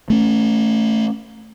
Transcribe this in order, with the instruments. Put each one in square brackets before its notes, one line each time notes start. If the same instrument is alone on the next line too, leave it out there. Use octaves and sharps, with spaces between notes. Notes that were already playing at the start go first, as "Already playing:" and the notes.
[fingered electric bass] A3 C#4